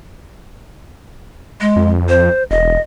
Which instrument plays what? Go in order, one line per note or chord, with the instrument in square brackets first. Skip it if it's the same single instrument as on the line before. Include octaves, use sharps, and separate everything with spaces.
[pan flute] G#3
[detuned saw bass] F2
[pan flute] C5
[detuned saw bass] E1 [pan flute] D#5